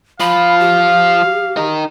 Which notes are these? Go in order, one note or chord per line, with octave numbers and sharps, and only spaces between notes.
F3 F4 F5 B5
G4
D#4 A#4